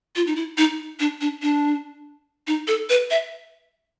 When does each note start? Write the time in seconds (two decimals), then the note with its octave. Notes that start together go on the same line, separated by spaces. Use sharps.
0.16 F4
0.27 D#4
0.36 E4
0.58 D#4
1.00 D4
1.21 D4
1.42 D4
2.47 D#4
2.68 A4
2.89 B4
3.11 E5